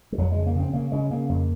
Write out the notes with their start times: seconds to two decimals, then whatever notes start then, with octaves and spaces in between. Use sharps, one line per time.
0.12 G#3
0.18 F2 F#3
0.32 C#3 G#3
0.47 A#3
0.55 C#3
0.60 C4
0.73 C#3 A#3
0.92 C#3 G#3
1.10 C#3 A#3
1.29 F2 A#3